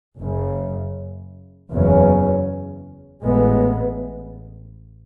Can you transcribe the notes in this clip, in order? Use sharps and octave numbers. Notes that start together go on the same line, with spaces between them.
F#1 F#2 C#3
F#1 E2 C#3 F#3 C#4
A1 A2 G#3 B3